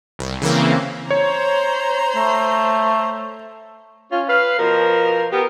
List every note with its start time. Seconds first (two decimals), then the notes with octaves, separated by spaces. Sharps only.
0.19 C2
0.42 C#3 E3 A#3 C4
1.11 C5 C#5 A#5 C6
2.15 A3
4.12 C#4 F4
4.29 B4 F5
4.59 B2 F3 A#4
5.32 B3 G4 A#4